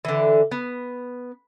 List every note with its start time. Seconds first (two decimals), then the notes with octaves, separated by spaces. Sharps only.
0.05 D3 E3
0.51 B3